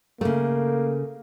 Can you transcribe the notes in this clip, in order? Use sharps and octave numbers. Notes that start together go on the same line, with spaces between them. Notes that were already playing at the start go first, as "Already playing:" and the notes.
C#3 A3 A#3